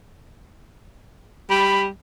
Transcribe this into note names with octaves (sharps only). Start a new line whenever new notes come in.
G3 B5